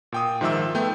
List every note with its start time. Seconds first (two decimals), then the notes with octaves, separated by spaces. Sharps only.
0.12 A#2 G5 D#6
0.41 G#2 D#3 F3 E5 D6 E6
0.75 A3 B3 G5 G6